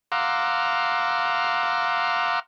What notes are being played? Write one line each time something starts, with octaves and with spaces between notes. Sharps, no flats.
F5 F#5 A#5 C6 D6 E6